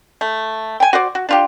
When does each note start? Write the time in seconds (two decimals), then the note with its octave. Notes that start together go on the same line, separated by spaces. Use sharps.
0.21 A3
0.80 G5 G#5
0.93 F#4 C5 D5
1.15 F#4
1.29 D4 F4 G4